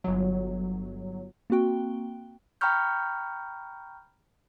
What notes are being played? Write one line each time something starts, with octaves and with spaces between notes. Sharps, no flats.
G1 F#3
A#3 C4 F#4 G5
G5 A#5 B5 C#6 F6 G6